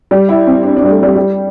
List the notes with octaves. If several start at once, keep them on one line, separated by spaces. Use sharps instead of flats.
G3
E4
C4
D4
D4
G3
A3
G3
G3